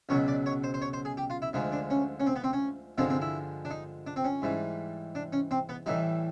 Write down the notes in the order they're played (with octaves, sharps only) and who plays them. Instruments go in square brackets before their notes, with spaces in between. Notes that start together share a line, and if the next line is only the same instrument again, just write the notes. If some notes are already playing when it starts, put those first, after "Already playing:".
[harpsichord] C#2 B2 F#3 C#5
D5
C#5
C5
C5
C#5
C5
G#4
G4
F4
E4
D2 D3 F3 G#3 D#4
D4
C#4
C#4
C4
B3
C4
C#4
G2 D3 F3 G#3 C4
C4
E4
D4
D#4
D4
C4
C#4
G#2 E3 G3
D4
C#4
C4
B3
A2 E3 G3 D#4